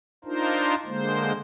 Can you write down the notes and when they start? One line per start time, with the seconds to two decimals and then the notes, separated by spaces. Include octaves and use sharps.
0.25 D4 D#4 F4 A#4 C5
0.86 D3 G#3 A#3 C5